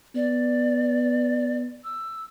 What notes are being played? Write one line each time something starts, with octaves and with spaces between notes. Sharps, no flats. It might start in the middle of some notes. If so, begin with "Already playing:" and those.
B3 D5
E6